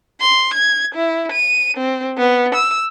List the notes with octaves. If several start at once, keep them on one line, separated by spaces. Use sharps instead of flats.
C6
G#6
E4
D#7
C4
B3
E6